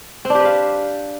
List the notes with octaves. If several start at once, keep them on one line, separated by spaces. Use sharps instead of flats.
C4
D4
G4
B4
F5